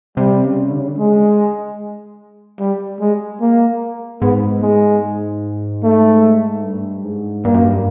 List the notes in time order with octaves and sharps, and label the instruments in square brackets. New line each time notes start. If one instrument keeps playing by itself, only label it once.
[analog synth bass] C3 [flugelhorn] G3
[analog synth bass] C#3
D3
C#3
D3
[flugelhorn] G#3
G3
G#3
A#3
[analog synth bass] G#2 [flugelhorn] B3
[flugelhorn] G#3
A3
[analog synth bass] G2
G#2
[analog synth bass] G2 [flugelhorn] A#3
[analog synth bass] F#2
G2